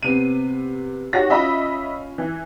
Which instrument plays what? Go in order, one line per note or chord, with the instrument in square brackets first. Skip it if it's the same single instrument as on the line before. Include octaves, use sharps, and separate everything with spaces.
[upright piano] C3 B3 C4 [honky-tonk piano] D#7
[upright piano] D#4 G4 C#5 [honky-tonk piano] F#4 A#6
[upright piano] C#4 F4 [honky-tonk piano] D#5 E5 B5
[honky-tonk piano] E3